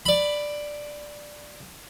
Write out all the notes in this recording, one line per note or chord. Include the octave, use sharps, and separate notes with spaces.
D5 B5